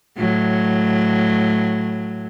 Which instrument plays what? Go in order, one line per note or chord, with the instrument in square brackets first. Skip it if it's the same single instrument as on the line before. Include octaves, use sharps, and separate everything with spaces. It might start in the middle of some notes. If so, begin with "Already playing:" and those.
[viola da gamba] A2 F#3